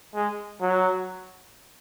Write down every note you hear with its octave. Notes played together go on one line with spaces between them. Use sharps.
G#3
F#3